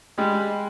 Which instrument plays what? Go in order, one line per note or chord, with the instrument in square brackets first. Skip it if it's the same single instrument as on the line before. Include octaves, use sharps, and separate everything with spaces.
[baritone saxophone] G3 [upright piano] G#3